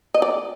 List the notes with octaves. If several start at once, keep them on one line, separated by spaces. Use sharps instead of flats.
D#5
D5